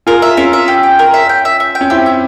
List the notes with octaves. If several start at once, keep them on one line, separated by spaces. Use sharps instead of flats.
F4 G#4 A#4
E5
C#4 F4 A#4
E5
G4
G5
A#4
E5
G5
E5
E5
G5
C#4
C4 E4 G4
E5